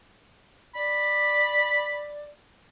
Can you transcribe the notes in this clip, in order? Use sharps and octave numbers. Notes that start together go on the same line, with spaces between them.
D5 B5